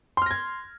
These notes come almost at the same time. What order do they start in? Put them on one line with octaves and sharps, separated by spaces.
C6 F6 A#6 G#6